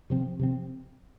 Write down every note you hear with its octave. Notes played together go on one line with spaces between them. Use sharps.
C3 F3 C4
C3 F3 C4